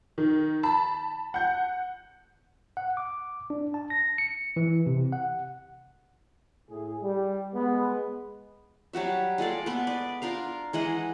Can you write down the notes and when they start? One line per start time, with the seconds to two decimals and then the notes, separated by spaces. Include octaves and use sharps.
0.18 D#3
0.63 A5 B5
1.34 F#5 G6
2.77 F#5
2.97 D6
3.50 D4
3.74 A5
3.90 A#6
4.18 C#7
4.56 E3
4.86 C3
5.12 F#5
6.69 A2 G#4
7.03 G3
7.54 G#3 B3
8.93 F#3 G3 F#4 E5
9.38 G#3 F4 A4 D5
9.66 B3 B4
9.87 D5
10.22 D4 F4 A#4 F5
10.73 E3 G#3 D#5 F#5